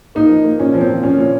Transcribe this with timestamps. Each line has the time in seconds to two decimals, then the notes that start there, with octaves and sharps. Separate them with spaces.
0.15 A#3 D#4
0.29 F3
0.44 A#3
0.59 A#2 C#4
0.74 F3
0.81 C4
0.89 F3
1.03 F3 C#4
1.18 A#2